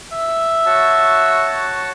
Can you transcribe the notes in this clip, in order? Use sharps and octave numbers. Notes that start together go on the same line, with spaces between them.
E5
F#4 C#5 A5